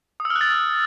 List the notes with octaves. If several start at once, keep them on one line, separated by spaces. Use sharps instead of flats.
D#6
E6
F6
F#6
A6